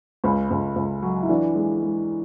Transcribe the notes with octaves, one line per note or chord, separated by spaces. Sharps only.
C#2 C#4
C#2
C#2
F#3
E4
E3 D4
G#3
G#3